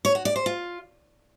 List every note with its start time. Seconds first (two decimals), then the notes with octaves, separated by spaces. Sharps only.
0.05 C#5
0.15 F#4
0.25 D5
0.36 C5
0.46 F4